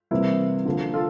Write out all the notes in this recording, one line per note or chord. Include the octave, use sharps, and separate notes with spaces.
C3 E3 G3 A#3 E4
D3 F3 A#3
F4 A4